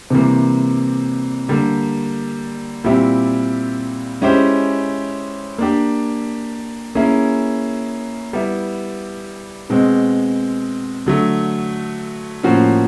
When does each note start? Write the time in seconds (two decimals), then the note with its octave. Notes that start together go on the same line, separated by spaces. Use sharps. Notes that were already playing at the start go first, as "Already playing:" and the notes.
0.10 C3 E3 G3 A#3
1.48 D3 G3 A#3
2.84 A#2 G3 C4 E4 G4
4.21 G#3 C#4 E4 G4 C5
5.58 A#3 D4 G4
6.95 A#3 C#4 E4 G#4
8.33 G3 B3 E4
9.70 B2 G#3 C4
11.06 D3 F#3 A3
12.43 A2 F3 A#3 C#4 F#4